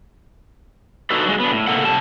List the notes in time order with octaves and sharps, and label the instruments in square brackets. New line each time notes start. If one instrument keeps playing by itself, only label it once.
[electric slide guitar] D4 D#4 F#4 A4 B4
F#3 G#3
B3 D4
A2
C3 A#3 A4 F#5
C3 G4 A5